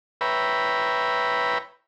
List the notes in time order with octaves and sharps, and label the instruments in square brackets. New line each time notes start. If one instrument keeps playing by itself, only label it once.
[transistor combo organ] B4 C#5 E5 G5 A#5 B5